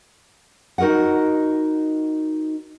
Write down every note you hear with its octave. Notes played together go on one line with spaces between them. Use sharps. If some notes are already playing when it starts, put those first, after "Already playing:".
D#4 F#4 A#4 D#5 F#5